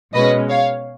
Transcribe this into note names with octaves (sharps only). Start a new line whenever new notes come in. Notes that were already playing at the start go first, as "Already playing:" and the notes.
B2 G#3 C#4 B4 D#5
C#5 F5